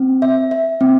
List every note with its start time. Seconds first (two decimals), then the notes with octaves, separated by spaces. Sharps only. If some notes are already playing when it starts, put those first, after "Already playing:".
Already playing: C4
0.22 E5
0.51 E5
0.81 C4